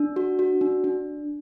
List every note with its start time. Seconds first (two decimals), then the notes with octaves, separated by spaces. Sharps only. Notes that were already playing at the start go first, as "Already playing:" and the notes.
Already playing: D4
0.16 F#4
0.39 F#4
0.61 D4
0.84 D4